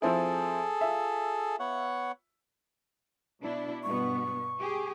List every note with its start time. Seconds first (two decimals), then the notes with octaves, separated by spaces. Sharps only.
0.02 F3 C4 E4 G#4 A4
0.81 F4 E5
1.60 B3 C#5 F#5
3.41 B2 D4 E4
3.83 G2 B2 B3 C#6
4.58 G4 G#4